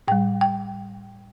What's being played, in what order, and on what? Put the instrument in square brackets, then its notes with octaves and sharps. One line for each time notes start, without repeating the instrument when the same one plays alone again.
[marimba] A2 G3 G5
G5